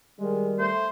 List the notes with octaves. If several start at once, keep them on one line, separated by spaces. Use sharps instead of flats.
D#3 G3 G#3
A3 C5